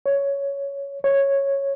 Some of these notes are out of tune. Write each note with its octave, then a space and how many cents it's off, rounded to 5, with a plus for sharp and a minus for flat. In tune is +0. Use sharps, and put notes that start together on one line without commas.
C#5 +10
C#5 -5